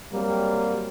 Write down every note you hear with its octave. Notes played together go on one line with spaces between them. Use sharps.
F#3 G3 A#3 C4